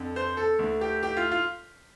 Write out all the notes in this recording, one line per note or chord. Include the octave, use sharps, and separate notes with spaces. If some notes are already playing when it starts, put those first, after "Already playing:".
Already playing: F2 D3
C5
A4
D2 D3
G4
G4
F4
F4